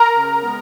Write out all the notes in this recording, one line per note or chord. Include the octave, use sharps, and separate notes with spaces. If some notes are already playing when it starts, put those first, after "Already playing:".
Already playing: A#4 A#5
C#3
G#3 B3